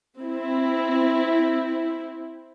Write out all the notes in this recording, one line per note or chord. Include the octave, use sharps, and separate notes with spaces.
C4 E4